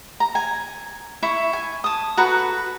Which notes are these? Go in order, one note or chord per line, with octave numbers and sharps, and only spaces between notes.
A#5
G#5
E4 E5 C#6
G#5
A5 D#6
F#4 A4 B4 A#5